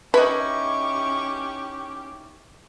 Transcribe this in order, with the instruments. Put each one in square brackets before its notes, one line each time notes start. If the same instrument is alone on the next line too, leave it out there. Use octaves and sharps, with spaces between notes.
[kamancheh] C#4 G4 [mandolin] D#4 E4 [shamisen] B4 [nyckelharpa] C#6